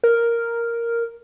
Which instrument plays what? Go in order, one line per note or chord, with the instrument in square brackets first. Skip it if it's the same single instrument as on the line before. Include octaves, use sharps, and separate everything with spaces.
[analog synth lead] A#4